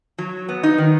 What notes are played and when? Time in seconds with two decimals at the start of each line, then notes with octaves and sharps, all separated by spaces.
0.18 F#3
0.49 B3
0.63 D#4
0.78 D#3